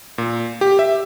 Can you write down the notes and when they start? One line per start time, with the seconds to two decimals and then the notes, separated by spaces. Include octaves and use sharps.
0.18 A#2
0.61 G4
0.79 E5